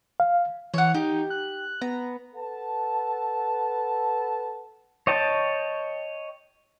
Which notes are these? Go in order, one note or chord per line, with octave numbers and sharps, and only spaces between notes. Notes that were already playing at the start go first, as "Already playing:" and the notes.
F5
E3 C#5 F#5
D#4 G4
F#6
B3 A#5
A4 B4 F#5 A5
C#5 D#5 G5 A5